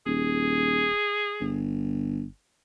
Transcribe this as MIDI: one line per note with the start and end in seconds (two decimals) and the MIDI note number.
0.06 0.89 27
0.06 1.64 68
1.41 2.25 31